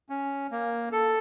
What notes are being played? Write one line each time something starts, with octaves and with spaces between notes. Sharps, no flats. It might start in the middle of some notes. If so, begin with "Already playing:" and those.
C#4
A#3
A4